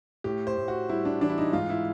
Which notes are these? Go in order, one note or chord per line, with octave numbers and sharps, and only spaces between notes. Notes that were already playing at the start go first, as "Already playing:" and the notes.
A2 G4
C5
A2
F#4
G3 E4
D4
E3 D4
E4
D#4
G#2 F4
E4